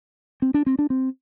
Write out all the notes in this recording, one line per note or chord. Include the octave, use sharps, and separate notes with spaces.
C4
D4
C4
D4
C4